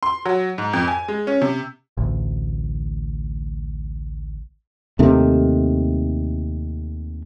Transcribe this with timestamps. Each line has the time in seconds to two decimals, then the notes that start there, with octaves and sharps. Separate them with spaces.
0.03 C6
0.26 F#3
0.58 G#2
0.73 F2
0.88 G#5
1.08 G#3
1.27 C#4
1.42 C3
1.97 A1 D2
4.99 D#2 C3 D#3 A3